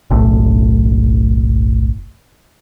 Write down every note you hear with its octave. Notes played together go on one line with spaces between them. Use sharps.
F#1 B1 A2